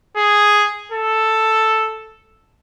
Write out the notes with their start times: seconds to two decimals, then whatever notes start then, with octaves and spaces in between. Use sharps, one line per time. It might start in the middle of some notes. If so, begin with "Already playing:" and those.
0.17 G#4
0.92 A4